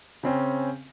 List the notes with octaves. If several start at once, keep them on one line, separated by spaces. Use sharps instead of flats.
C#3 C4 C#4